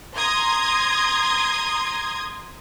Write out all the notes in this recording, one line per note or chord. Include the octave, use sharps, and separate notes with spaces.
A#5 C6 D#6 G#6